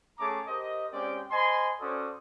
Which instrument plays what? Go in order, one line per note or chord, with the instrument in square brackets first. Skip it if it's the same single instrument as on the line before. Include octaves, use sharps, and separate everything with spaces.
[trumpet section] A3 C#4 G#4 A5 A#5 D6
G4 A#4 C5 D#5
G#3 C4 C#4 G4 D5 G5
C5 D#5 G#5 B5 C6
C#4 F#4 A4 C5 D5 D#6